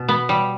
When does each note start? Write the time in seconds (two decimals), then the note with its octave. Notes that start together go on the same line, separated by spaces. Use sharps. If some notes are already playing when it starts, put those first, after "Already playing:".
Already playing: B2
0.08 B3
0.29 G3